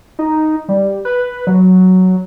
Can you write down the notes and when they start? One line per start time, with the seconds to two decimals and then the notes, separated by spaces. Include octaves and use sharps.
0.19 D#4
0.69 G3
1.05 B4
1.47 F#3